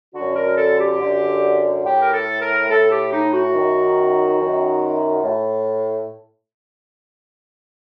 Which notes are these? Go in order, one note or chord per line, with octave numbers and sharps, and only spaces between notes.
F#2 D3 F#4
A#4
A4
G4
F#2 D3
A2 G4
A#4
A4
A#4
A2 A4
G4
D#4
F#4
F#2 D#3
F#2 D#3
A2